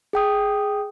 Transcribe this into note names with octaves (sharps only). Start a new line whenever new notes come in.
G#4 G5 D#6